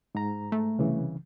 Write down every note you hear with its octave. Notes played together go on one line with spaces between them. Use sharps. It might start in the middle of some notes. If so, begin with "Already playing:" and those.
G#2 A#5
A3
C2 C#3 E3